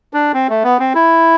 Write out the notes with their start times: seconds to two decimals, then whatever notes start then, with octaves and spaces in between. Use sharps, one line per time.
0.14 D4
0.34 C4
0.49 A3
0.64 B3
0.79 C4
0.95 E4